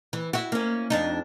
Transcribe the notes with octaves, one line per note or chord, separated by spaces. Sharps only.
E3
E4 F#4
A#3 C#4
F2 D4 D#4